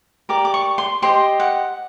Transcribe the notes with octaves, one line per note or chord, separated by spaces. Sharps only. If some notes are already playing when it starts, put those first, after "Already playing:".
G4 A#4 D5 D6
D6
C#6
C6
G4 C5 D#5 C6
F#5